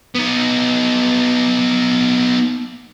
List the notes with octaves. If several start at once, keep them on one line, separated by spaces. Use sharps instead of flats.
B3 D#4